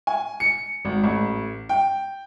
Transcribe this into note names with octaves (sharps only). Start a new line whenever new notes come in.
G#5
C#7
G#1
A1
G5